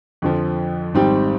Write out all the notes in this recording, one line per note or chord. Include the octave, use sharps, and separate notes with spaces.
F2 D3 F3
G#1 G#2 G3 C4 G4